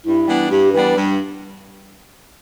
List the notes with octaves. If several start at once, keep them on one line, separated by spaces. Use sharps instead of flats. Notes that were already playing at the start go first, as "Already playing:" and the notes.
G2 E4
E3 G3 B3 D4
G2 G4
E3 G3 B3 D4 B4
G2